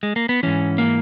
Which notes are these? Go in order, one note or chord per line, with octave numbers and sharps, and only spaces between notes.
G#3
A#3
B3
G#2 E3 C#4
A#3